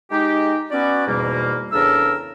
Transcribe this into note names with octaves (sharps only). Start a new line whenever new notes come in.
G#3 D#4 G4
B3 C#4 F#4 D5
E2 G#2 B2 G3 A#3
E2 C#3 D4 A4 A#4 E6